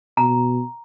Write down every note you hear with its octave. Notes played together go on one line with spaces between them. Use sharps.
B2 A#5